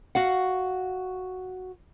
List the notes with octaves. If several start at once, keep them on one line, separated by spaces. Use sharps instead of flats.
F#4 F5 F#5